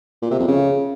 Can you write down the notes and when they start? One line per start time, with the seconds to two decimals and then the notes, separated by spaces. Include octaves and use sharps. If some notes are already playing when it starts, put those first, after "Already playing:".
0.22 A#2
0.31 C3
0.39 F2
0.48 C#3